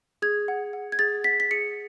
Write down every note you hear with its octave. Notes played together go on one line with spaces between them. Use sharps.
G#4 G#6
F#5
F#5
G#6
G#4 A6
F#5 B6
B6
G#4 C#7